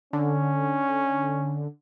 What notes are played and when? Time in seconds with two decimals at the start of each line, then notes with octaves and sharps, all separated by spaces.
0.13 D3 C#4